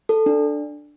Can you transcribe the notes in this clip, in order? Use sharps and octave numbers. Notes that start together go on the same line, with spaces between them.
A4
D4